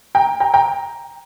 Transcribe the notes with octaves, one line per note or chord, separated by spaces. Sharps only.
G5 A#5
G5 A#5
G5 A#5